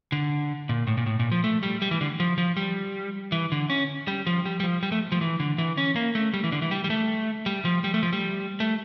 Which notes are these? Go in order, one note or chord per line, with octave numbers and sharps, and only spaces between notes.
D3
A#2
A2
A#2
A2
A#2
F3
A3
G3
G3
E3
D3
F3
F3
G3
E3
D3
C#4
G3
F3
G3
G3
F3
G3
A3
F3
E3
D3
E3
C#4
A#3
A3
G3
E3
D3
E3
G3
G3
A3
G3
F3
G3
A3
F3
G3
A3